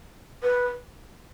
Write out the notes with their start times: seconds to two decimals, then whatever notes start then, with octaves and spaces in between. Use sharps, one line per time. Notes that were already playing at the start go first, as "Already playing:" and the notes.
0.43 B4